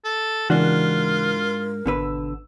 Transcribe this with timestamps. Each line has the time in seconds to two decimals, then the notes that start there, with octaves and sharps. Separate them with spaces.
0.05 A4
0.50 G#2 C#3 E3 D4 F4 F#4 A#4 F#6
1.86 G#1 B2 D3 B4 E6